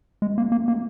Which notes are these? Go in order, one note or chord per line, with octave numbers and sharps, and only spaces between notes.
G#3
A#3
A#3
A#3